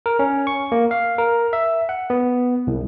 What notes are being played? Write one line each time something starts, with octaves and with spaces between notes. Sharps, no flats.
A#4
C#4
C#6
A#3
F5
A#4
E5
F#5
B3
C2